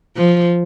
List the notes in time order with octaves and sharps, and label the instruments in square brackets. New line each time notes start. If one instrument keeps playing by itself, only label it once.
[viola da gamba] F3